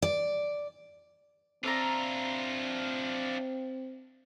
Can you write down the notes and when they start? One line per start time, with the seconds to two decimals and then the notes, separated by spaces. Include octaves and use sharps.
0.02 D5
1.64 C4 D4 F4 D5 E5 A#5